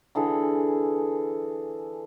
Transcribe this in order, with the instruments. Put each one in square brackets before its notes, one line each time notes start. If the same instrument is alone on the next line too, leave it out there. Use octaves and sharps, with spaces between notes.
[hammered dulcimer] D3 E3 G#4 A4